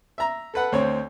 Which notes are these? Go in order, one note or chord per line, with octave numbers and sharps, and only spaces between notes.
E5 A#5
A4 B4 F#5
D2 C4 C#5